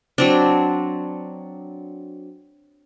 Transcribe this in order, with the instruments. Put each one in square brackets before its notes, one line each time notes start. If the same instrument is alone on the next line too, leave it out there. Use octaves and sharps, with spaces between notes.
[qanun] F#3 C4 D4